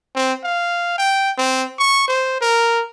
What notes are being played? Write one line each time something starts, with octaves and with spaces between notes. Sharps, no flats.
C4
F5
G5
C4
C#6
C5
A#4